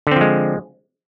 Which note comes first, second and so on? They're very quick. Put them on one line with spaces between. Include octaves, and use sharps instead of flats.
D3 C4 F3 G#3